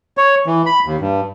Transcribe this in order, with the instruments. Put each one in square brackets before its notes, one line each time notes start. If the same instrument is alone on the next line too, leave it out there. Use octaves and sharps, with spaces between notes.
[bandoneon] C#5
E3
B5
D#2
G2